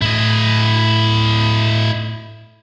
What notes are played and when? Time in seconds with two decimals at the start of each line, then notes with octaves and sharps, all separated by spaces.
0.02 A2 E4 D#5